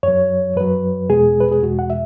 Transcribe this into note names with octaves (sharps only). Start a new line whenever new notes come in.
F#2 F#3 C#5
F#2 F#3 B4
E2 B2 G#3 G#4
B4
G#4
E2 B2 G#3 F#4
F#5
E5